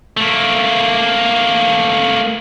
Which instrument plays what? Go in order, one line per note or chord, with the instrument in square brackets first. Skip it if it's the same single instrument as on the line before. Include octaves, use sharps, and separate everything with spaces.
[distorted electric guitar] A3 A#3